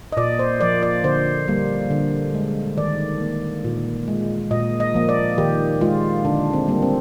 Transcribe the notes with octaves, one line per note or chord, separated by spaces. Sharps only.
D#5
A#2 D5
C5
F3 A#3 D5
D5
D3 C5
G3 A#3
D3
G#3
D#3 D5
A#3
A#2
G#3
A#2 D#5
D#5
F3 A#3
D5
D#3 G4
G#3 F4
D3 D4
C4
G3 A#3
C4